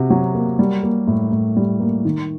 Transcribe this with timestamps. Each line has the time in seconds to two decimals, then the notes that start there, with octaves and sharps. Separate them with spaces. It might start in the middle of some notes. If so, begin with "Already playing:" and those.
Already playing: C3 F#4
0.10 F#3
0.35 A#3
0.59 G3
0.83 A#3
1.07 A2
1.32 A2
1.57 G3
1.80 A#3
2.05 D#3